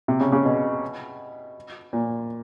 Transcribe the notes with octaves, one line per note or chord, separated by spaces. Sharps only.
C3
C#3
C#3
B2
A#2